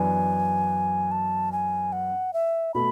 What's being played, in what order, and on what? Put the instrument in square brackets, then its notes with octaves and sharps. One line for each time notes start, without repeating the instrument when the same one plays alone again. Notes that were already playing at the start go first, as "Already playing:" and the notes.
Already playing: [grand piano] F#2 E3 B3 D4 [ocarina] G#5
[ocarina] A5
G#5
F#5
E5
[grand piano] B2 A3 [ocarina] B5